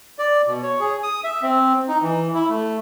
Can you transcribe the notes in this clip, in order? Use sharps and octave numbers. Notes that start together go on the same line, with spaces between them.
D5
B2
C#5
G#4
D#6
E5
C4
D#4
E3
E4
A3